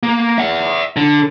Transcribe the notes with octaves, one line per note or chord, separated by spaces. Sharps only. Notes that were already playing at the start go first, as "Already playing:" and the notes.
A#3
E5 F#5
D3